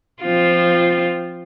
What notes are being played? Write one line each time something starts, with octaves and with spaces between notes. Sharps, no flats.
F3 C4 F4